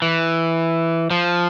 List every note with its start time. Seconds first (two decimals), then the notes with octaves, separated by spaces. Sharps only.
0.02 E3
1.11 F3